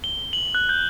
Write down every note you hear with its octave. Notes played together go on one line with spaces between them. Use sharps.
G7
F#7
F#6
G6